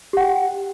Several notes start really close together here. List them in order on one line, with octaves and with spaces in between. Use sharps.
G4 F#5 G5